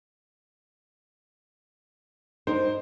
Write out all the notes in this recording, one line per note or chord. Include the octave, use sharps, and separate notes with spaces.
D4 D#4 A#4 C5